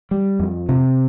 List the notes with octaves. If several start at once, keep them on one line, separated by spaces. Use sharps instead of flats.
G3
F2
C3